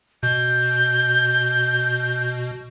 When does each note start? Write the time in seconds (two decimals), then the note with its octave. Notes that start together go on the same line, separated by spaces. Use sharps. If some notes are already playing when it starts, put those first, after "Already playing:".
0.23 B2 G6